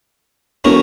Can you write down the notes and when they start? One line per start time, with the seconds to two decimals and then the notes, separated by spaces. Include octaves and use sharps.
0.64 E1 A3 C#4 A#4